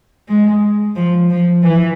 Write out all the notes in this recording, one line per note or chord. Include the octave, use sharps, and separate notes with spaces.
G#3
F3
F3
E3